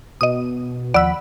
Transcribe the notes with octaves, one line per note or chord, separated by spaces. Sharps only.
B2 D#5 D#6
D#2 F3 D5 F#5 B5 E6